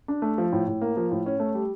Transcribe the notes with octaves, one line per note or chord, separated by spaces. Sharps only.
D4
A3
F3
A2
A2
A#3
F3
A2
C#4
A3
G3